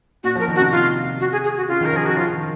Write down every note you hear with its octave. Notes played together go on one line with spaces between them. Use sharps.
A#2 F#4
F3
A#4
D#3
F#4
C3
F4
F#4
G#4
G#4
F#4
C#3 F4
D#3
A#4
F3
G#4
F#4
F3 F4
D#3